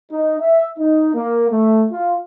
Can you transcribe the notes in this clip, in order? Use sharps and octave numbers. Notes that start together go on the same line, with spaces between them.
D#4
E5
D#4
A#3
A3
F4